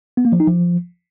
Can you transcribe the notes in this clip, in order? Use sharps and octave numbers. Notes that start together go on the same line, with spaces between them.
B3
A#3
F3
D#4
F3